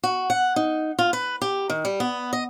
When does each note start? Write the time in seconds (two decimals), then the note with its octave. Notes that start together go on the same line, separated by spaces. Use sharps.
0.03 F#4
0.30 F#5
0.56 D#4
0.99 F4
1.13 B4
1.42 G4
1.70 D#3
1.85 G3
2.00 B3
2.33 D#5